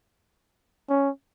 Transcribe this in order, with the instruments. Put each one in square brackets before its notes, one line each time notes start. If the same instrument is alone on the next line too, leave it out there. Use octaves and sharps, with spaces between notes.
[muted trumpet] C#4